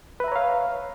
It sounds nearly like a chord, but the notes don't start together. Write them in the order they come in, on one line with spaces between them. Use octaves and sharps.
B4 E5 A#5 C#5 F5